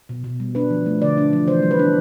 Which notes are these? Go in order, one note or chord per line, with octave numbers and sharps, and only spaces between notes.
B2
B2
G3
D4 B4
F3
A3
D3 D5
D4
F3
E3 C5
G3
B4
D4